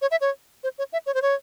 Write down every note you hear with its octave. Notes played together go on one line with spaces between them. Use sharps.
C#5
E5
C#5
C5
C#5
E5
C#5
C5
C#5